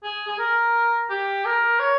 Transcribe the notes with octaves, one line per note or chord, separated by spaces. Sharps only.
G#4
G#4
A#4
G4
A#4
C#5